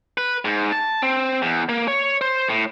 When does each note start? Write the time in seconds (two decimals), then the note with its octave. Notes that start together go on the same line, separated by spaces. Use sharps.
0.18 B4
0.45 G#2
0.72 A5
1.02 C4
1.42 E2
1.69 A#3
1.88 C#5
2.21 C5
2.49 A2